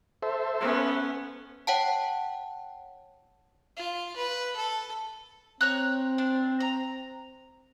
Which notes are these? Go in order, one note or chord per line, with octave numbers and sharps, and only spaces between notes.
A4 C5 E5
B3 C#4
C#5 F#5 G5 A5
F4
B4
A4
C4 C#5 A#5 F#6
D4
A#5